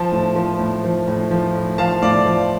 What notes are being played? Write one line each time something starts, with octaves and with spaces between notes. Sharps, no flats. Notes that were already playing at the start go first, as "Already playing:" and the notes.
Already playing: F3 A5
A2
F3
A2
F3
A2
F3
A2
F3 F5 A5
A2 D5 F5
F3